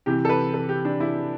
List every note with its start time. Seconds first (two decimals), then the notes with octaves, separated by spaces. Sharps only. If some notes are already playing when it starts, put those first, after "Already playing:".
0.06 C3 E3 G4
0.25 A4
0.29 B4
0.54 A4
0.69 G4
0.85 D4
1.00 E4